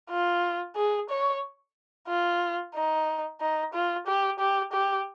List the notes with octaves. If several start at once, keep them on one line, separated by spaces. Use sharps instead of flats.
F4
G#4
C#5
F4
D#4
D#4
F4
G4
G4
G4